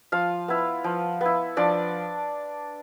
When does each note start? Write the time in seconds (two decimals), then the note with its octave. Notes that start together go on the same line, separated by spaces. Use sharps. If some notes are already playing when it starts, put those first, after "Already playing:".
0.12 F3 F4 F5
0.48 B3 E4
0.84 F3
1.21 B3 E4
1.57 F3 D4 D5